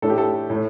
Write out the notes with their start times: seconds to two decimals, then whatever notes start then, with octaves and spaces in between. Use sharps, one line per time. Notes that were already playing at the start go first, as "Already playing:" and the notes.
0.02 A2 A3 D4 A4
0.10 G4
0.18 A4
0.50 A2 A3